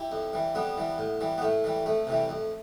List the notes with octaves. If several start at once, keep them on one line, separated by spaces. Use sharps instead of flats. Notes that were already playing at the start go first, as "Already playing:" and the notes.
Already playing: E4 G4
F2
E3 G3
F2 G3 B3
E3 G3
A2
E3 G3
B3
A2 A3
E3 G3
F2 A3
C3 E3 G3
F2